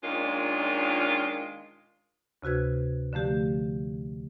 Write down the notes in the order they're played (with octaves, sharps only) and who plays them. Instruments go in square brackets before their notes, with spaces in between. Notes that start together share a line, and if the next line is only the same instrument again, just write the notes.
[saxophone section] A#2 D#3 G#3 C#4 D4 F4
[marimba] D2 C3 F#4 B4 G#6
D3 F3 A3 G4